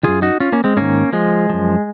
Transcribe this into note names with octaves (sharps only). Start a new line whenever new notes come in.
F#2 D#3 F4 G#4
D#4 F#4
C#4 F4
A#3 C#4
G#3 C4
G#2 D#3 A#3 C#4
F3 G#3
F#2 F3